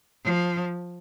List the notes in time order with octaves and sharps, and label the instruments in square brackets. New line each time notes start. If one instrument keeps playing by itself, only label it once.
[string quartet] F3